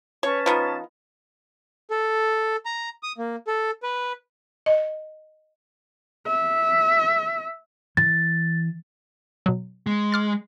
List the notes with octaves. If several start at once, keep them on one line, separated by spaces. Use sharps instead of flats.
C#4 B4 C#5 A5
F3 B3 D#4
A4
A#5
D#6
A#3
A4
B4
D#5
E5
E3 A6
B2 F#3
G#3
D6 F6 A6